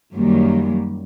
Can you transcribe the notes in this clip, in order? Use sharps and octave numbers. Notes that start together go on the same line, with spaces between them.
F#2 D#3 F#3 G3 A#3